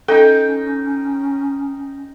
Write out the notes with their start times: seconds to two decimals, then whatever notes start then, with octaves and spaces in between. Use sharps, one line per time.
0.08 C#4 D#4 A4 G5